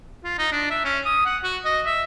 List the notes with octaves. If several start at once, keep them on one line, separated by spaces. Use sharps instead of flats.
F4
D#4
D4
E5
C#4
D#6
F#5
F#4
D#5
E5